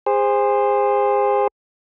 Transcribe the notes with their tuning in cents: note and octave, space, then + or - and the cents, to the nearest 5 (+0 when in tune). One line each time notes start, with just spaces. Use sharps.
G#4 -30 C5 +0